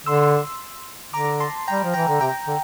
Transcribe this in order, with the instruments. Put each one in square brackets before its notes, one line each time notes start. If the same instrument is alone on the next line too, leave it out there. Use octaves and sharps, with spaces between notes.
[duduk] D3 [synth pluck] C6 E6
[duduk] D3 [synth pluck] A#5 D6
[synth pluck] A5 C6
[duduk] G3 [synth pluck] G5 A#5
[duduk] F3
[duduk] E3 [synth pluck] G5 A#5
[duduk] D3
[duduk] C3 [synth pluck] G5 A#5
[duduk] D3